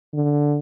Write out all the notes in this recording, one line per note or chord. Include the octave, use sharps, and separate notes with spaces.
D3